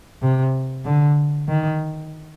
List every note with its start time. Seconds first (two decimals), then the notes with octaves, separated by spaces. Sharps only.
0.22 C3
0.85 D3
1.49 D#3